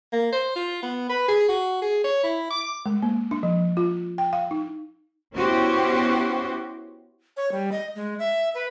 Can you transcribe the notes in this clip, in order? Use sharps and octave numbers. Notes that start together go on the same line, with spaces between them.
A#3
C5
F4
B3
B4
G#4
F#4
G#4
C#5
E4
D6
G#3
A#3
D4
F3
F4
G5
F5
D#4
B3 C#4 E4 F#4 G4 C5
C#5
G3
D#5
G#3
E5
B4